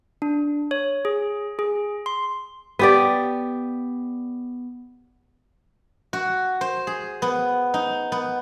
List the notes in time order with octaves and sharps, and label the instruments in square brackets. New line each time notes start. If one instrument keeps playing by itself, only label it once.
[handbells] D4
C#5
G#4
G#4
C6
[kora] B3 G4 D5
[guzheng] F#4
C5
G#4
B3
D#4
B3